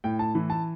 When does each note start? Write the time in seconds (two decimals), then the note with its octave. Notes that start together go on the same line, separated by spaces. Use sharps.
0.04 A2 G5
0.19 A5
0.35 E3
0.50 A5